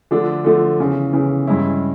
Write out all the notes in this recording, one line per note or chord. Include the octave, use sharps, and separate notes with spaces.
D3 F3 A3 D4
D3 F3 A3 D4
E2 C#3 E3
E2 C#3 E3
G2 E3 G#3 C#4 E4